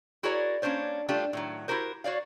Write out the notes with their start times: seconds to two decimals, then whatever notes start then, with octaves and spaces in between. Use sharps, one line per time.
0.23 E4 F#4 G#4 A#4 C#5 D5
0.62 A#3 C#4 D4 C5 C#5
1.08 G3 A3 D4 F4 G4
1.33 A2 D#3 F#3
1.68 E4 F#4 G4 A#4 C5
2.04 F#4 C#5 D5 F5